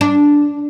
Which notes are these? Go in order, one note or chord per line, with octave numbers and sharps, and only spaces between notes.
D4